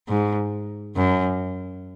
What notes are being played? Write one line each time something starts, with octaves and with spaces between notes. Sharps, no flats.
G#2
F#2